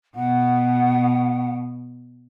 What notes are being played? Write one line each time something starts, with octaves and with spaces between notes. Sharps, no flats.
B2 F#5